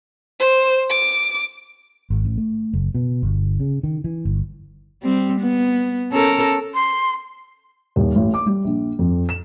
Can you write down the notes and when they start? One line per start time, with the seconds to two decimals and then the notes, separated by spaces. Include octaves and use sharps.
0.40 C5
0.90 D6
2.10 G#1
2.25 A1
2.38 A3
2.73 F#1
2.95 B2
3.23 G1
3.60 C#3
3.83 D#3
4.04 E3
4.25 G1
5.03 G3 C4
5.41 B3
6.12 C#4 A4 A#4
6.75 C6
7.96 D#1
8.15 A1
8.34 D6
8.46 G3
8.64 A#1
8.99 F2
9.29 E7